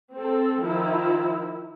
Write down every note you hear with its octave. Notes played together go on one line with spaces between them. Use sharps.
C4 A4
D#3 F3 E4